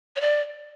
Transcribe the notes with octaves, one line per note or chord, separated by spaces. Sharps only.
C#5
D5